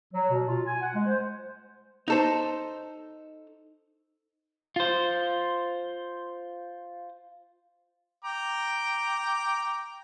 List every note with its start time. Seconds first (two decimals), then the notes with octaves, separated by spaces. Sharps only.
0.13 F#3
0.30 B2
0.47 F4
0.65 G#5
0.81 F#5
0.94 G#3
1.05 C5
2.08 D#4 A4 C5
4.76 F4 C5
8.24 G5 A#5 D6